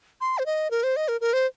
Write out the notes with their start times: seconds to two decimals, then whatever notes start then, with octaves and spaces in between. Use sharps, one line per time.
0.21 C6
0.38 C5
0.46 D#5
0.71 A#4
0.83 C5
0.96 D#5
1.08 A#4
1.21 A#4
1.33 C5